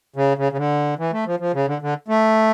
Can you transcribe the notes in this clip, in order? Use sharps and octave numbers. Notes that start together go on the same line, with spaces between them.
C#3
C#3
C#3
D3
E3
A3
F3
F3
C#3
D3
D3
A3